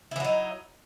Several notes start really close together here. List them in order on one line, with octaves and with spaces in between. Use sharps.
E4 E3 F#3 D#4